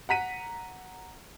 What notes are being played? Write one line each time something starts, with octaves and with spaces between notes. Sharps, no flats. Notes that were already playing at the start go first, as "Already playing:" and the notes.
F#5 A#5 B6 D#7